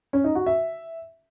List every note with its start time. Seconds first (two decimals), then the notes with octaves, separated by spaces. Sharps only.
0.13 C#4
0.24 D#4
0.35 F#4
0.46 E5